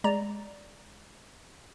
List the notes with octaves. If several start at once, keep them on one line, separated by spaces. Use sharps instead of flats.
G#3 D5 A#5